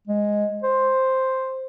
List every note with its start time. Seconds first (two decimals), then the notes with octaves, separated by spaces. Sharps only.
0.07 G#3
0.64 C5